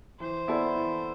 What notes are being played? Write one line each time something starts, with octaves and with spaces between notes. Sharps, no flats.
E3 C5
B3 E4 A4 D5
E3